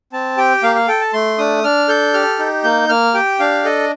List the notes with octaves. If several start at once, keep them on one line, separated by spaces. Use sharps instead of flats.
C4 A5
G4 G5
A#3 F5
F5
A4 G5
A5
A3 C6
D4 D#6
D4 F6
A4 G6
G4 F6
D#4
A#3 G6
A#3 F6
G4 G5
D4 F5
A4 D#5